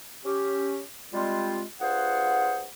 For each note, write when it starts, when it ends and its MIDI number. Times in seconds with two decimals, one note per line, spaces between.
0.25 0.81 61
0.25 0.81 67
1.13 1.62 55
1.13 1.62 56
1.13 1.62 60
1.13 1.62 65
1.81 2.66 43
1.81 2.66 65
1.81 2.66 68
1.81 2.66 72
1.81 2.66 78